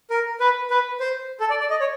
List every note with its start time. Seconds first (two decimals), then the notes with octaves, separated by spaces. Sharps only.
0.10 A#4
0.40 B4
0.70 B4
1.00 C5
1.40 A4
1.50 D5
1.60 D5
1.70 D#5
1.80 C#5